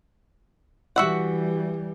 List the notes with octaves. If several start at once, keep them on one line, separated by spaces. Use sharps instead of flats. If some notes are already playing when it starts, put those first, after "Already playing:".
E3 G3 F#4 E5 F#5